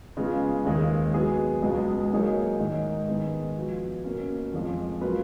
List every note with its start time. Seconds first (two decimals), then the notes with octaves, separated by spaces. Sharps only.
0.17 C#3 G#3 B3 F4 G#4
0.65 D#2 D#3 G#3 D#4 G#4
1.14 F#3 B3 D#4 G#4
1.62 C#2 B2 G#3
2.11 F#3 A#3 D#4 G#4 C#5
2.59 G#2 D#3 G#3 D#4
3.08 D#3 G#3 B3
3.56 F3 B3 F#4
4.04 B2 A#3 C#4
4.54 F2 F3 G#3
5.01 F#3 A#3 F4 B4